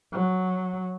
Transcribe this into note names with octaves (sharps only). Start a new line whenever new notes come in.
F#3